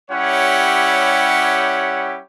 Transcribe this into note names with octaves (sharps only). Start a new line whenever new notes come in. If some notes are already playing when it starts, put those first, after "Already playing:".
G3 C#4 E4 G4 C#5 F#5